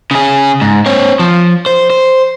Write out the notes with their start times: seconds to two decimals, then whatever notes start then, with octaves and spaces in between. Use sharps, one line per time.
0.11 C#3 G#4
0.61 G#2
0.86 C4 C#5
1.19 F3
1.66 C5
1.90 C5